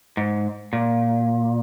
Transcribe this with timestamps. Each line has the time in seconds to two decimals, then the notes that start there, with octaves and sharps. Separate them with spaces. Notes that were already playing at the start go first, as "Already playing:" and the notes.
0.17 G#2
0.73 A#2